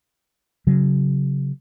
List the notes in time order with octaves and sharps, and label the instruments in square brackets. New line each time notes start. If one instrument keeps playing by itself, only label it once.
[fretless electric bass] C#3 F#3